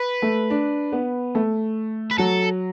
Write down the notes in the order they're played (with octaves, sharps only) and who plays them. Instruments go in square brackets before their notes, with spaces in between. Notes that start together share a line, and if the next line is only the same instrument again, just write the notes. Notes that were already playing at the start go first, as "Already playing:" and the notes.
Already playing: [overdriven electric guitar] B4
[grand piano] A3
D4
B3
A3
[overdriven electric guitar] B4
[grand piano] F#3 [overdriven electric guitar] A4